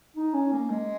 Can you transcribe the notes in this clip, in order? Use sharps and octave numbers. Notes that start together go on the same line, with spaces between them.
D#4
C#4
A#3
G#3